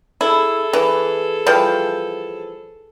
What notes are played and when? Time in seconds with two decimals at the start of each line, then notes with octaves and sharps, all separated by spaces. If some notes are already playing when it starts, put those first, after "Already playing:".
0.21 E4 G#4 A4
0.73 E3
1.46 E3 F3 G3